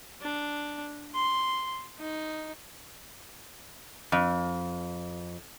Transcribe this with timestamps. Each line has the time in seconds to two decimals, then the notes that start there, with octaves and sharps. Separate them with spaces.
0.22 D4
1.15 C6
1.99 D#4
4.12 F2